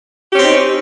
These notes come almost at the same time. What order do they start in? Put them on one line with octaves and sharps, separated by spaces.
G4 C#4 C4 D#4